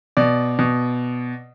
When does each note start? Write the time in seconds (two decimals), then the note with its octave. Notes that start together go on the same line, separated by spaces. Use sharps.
0.17 B2 D5
0.59 B2